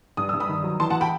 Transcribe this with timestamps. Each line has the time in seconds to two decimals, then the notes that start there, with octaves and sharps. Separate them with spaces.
0.17 G2 D#6
0.29 G2 E6
0.40 B5 D#6
0.49 D#3
0.64 F#3
0.79 E3 A5 C6
0.90 F#5 A5
1.01 G5 B5